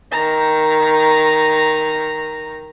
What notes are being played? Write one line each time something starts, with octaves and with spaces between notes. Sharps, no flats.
D#3 A#5